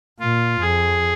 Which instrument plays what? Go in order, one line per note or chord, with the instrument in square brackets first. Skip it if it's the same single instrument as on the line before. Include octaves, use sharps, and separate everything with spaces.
[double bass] A#2 [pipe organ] F4
[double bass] F2 [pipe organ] G#4